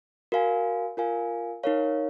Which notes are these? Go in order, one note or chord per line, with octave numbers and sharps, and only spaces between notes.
F#4 A#4 F5 G#5
F4 A#4 F5 G#5
D#4 A#4 C#5 F5